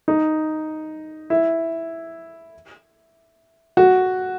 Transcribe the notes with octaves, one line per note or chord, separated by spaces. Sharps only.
D#4
E4
F#4